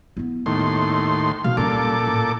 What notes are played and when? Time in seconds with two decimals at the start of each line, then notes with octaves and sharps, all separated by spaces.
0.17 B3 E4
0.46 D#2 A2 C6
1.44 B2 D#3 F5
1.57 A#2 G3 C#4 A4 D6
2.07 A2